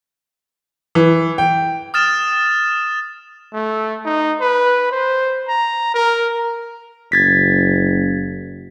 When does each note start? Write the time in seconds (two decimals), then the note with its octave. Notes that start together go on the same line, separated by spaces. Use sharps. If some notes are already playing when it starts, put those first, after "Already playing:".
0.95 E3
1.38 G5
1.94 D#6 F6 A6 E7
3.54 A3
4.05 D#4
4.40 B4
4.92 C5
5.49 A#5
5.94 A#4
7.12 F#1 G#6 A6 B6